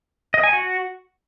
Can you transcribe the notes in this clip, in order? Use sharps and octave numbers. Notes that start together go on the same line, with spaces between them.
D#5
G#5
F#4